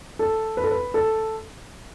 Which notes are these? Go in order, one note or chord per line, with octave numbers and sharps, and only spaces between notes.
A4
B4
A4
B4
A4